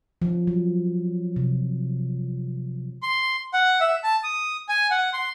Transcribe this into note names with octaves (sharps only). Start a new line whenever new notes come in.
F3
F#3
C3
C6
F#5
E5
A5
D#6
G#5
F#5
C6